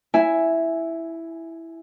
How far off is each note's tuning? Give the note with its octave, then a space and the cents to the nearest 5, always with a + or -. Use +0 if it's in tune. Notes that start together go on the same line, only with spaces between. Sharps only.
E4 +0 E5 +0 G#5 +0